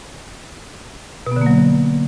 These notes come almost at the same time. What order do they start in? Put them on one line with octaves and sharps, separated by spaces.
B2 B3 D3 A#3 F#3